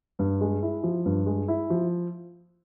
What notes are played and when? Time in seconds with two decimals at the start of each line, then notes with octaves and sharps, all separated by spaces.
0.19 G2
0.41 G#3
0.63 E4
0.83 F3
1.05 G2
1.26 G#3
1.48 E4
1.70 F3